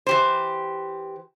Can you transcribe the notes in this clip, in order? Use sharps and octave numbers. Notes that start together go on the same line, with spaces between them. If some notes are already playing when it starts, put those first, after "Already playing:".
E3 G4 C5